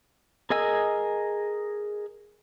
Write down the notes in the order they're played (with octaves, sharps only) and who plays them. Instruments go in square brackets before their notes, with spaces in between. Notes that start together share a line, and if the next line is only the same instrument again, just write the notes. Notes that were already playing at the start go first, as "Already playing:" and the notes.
[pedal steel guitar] G#4 A#4 D#5 G#5 E6